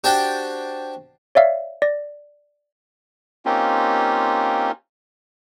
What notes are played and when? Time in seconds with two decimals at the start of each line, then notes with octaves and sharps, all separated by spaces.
0.04 D4 F#4 G4 C5 G5 A5
1.35 C#5 D5 E5 F5
1.82 D5 A#6
3.45 A#3 C4 C#4 D#4 F4 G4